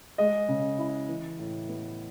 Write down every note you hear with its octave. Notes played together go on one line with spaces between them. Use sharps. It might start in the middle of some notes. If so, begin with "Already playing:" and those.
G#3 D#5
C#3
E4
E3
A2
B3